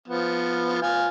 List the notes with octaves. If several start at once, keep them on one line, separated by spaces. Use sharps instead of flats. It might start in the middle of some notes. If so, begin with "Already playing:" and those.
F3 B3
F4 G#5